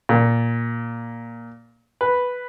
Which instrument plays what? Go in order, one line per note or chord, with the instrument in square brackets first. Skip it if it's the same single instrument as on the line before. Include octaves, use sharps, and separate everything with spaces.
[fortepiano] A#2
B4